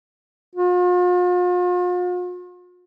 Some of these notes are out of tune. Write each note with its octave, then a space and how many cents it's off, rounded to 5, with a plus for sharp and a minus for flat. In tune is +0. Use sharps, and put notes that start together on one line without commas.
F4 +45